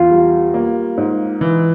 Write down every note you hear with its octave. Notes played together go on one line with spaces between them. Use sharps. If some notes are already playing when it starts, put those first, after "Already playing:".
Already playing: E2 F4
G3
A#3
G#2
E3